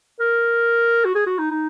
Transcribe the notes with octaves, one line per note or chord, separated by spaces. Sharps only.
A#4
F#4
G#4
F#4
D#4
D#4